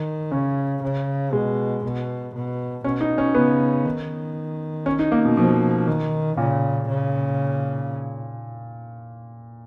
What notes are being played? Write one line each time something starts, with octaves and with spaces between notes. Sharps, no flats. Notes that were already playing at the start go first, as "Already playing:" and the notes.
Already playing: D#3
C#3 C#4
C#3
B2 G#3
B2
B2
B2 C#4
D#4
C#4
C#3 B3
D#3
C#4
D#4
A#3
B2
B2 F3
D#3
A#2 C#3
C#3